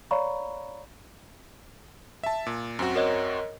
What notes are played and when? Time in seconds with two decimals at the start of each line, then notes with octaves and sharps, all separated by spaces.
0.11 C#5 D5 F5 A#5 B5 C#6
2.23 E5 A5
2.46 A#2
2.79 F#2 C4 F#4
2.96 A#4 C#5 D#5